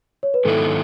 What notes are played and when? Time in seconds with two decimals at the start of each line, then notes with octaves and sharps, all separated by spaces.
0.23 C#5
0.34 B4
0.45 G#2 D#3 F#3 B3 E4 A4